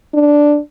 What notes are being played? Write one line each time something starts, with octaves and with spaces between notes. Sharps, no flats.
D4